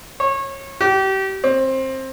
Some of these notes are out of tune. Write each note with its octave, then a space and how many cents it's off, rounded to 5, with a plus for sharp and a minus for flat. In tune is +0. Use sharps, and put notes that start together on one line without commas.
C#5 -25
G4 -30
C4 +20